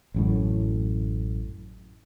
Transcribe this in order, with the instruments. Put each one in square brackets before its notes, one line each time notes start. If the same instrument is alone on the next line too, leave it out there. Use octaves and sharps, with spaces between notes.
[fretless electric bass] A1 F#2 A2